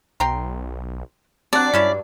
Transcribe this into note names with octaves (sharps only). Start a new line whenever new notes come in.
B1 G5 A#5 C6
F#3 C4 D4 D5 F#5 A5
G2 C#4 E4 C#5